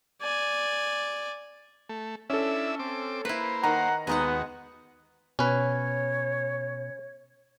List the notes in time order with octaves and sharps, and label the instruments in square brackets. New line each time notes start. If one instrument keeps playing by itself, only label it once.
[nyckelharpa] D5 G#5
[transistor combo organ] A3
[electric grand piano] C#4 A4 [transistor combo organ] D4 E4 E5
[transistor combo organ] C4 D6
[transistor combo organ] A#3 C5 [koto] E4 B4
[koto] D#3 [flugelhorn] F#5 [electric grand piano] A#5
[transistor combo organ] D#2 F#4 [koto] G#3 D#4 F#5 [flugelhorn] B3
[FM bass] B2 [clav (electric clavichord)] C#4 B4 [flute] C#5